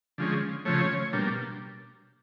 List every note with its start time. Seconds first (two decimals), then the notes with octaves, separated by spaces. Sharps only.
0.18 D3 F3 G#3 C#4
0.65 C#3 F3 A3 C#5
1.13 B2 G3 A#3 D4